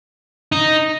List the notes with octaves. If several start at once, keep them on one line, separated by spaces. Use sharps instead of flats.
D#4